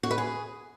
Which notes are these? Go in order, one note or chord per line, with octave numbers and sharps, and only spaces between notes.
F#4
B4
G#4